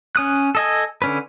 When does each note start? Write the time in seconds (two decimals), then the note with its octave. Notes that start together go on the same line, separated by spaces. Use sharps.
0.16 C#4 D#6 F#6
0.55 A4 D#5 G#5
1.02 D3 C#4 B4